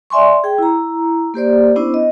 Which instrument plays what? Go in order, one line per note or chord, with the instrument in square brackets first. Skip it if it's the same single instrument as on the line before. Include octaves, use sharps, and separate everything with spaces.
[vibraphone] D5 E5 G#5 C6 C#6
G#4 G5
E4 A#5
A#3 G4 C5 D5
B3 C#4 D4 E4 C5
D#5